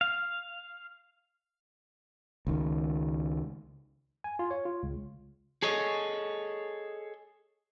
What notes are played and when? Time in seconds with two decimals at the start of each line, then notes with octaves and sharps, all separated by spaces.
0.01 F5
2.47 C#2 D#3
4.24 G#5
4.39 F4
4.51 C#5
4.65 F4
4.83 C#2
5.62 G#4 A4 C#5 D#5